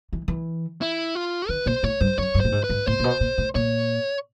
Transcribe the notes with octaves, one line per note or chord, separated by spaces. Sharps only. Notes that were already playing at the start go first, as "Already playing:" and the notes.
E3
E3
E4
F4
D#3 B4
A#2 C5
A2 C#5
G2 C5
F#2 C#5
G2
A2 C5
G#2
B4
G#2
A2 C5
A#2
B2
A#2
A2
A#2 C#5